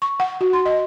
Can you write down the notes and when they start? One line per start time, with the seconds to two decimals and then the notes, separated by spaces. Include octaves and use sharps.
0.02 C#6
0.20 F#5
0.41 F#4
0.53 C6
0.66 D#5